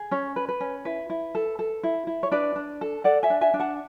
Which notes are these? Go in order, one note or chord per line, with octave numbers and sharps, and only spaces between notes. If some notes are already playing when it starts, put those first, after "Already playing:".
Already playing: G#4
C#4 C#5
B4
B4
C#4
E4 B4
E4
A4
A4
E4
E4
C#5
D4 B4 D5
D4
A4
A4 D5 F#5
E5 G#5
D4
E5 G#5
D4
F#5 A5